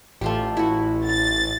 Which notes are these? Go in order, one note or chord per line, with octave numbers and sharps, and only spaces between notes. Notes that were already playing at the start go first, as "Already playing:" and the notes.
A1 A3 F4 G4
E4 F#4
A6